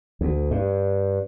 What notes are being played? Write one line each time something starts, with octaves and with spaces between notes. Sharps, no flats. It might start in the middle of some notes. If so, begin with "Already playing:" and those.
D2
G2